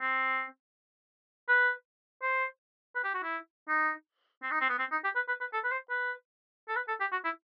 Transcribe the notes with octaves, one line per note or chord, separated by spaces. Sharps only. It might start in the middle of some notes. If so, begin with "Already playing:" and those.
C4
B4
C5
B4
G4
F#4
E4
D#4
C4
D#4
C4
B3
C4
D#4
G4
B4
B4
B4
A4
B4
C5
B4
A4
B4
A4
G4
F#4
E4